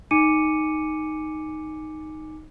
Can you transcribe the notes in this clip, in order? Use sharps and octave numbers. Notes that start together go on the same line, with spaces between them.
D#4 G#5 D6 C#7 D#7